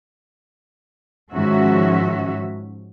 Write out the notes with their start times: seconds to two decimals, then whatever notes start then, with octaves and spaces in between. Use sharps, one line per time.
1.32 G#2 D#3 F3 C#4 F#4 E5